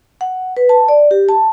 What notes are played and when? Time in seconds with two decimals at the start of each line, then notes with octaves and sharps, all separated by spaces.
0.21 F#5
0.57 B4
0.69 A5
0.88 D5
1.11 G4
1.29 A5